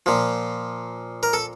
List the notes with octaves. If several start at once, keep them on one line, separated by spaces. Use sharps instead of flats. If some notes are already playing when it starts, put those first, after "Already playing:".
A#2 F3
A#4
A4